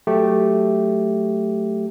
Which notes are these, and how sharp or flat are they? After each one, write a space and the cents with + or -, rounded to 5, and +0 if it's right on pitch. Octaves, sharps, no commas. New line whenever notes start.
F#3 +0 A3 +0 G4 +0